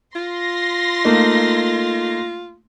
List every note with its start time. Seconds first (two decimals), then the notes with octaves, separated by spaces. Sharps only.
0.15 F4 C6 A#6
1.05 A3 A#3 D#4